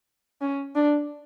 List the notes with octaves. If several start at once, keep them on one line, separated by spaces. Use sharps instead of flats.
C#4
D4